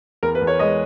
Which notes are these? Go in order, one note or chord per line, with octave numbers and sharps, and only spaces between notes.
E2 A#4
B4
E2
C#5
G#3 D#5